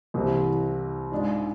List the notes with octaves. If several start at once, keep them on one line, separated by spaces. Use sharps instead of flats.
C2 C3 E3
G#2 G#3 D4 F4